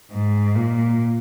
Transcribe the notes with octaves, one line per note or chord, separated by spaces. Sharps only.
G#2
A#2